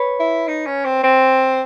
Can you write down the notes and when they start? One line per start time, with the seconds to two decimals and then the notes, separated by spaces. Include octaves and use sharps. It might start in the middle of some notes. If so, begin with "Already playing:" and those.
Already playing: B4 C#5
0.20 E4
0.48 D#4
0.67 C#4
0.85 C4
1.04 C4